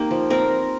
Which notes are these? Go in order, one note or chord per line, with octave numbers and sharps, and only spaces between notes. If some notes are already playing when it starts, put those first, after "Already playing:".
Already playing: A#3 C4 D#4 G4
F3
C4 A#4